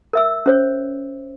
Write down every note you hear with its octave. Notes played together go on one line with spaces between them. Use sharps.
A#4 E5 E6
C#4 C5 C#5